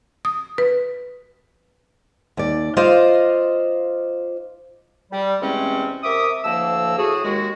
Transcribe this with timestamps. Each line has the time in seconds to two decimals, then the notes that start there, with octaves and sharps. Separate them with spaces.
0.25 D#6
0.58 B4
2.37 D#2 D5
2.77 F4 C5 D5 D#5 F5
5.12 G3
5.41 E2 C3 G#3 A3 C4 C#4
6.04 C3 A#4 E5 D6 D#6
6.44 D2 A2 F3 A#3 A5 E6
6.98 A2 F#4 G#4
7.24 D#2 G#3 F#4